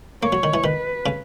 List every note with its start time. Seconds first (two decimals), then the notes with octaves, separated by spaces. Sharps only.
0.23 A#3 C#5
0.33 F#3
0.43 D#3
0.54 E3
0.64 D#3 B4
1.06 C#3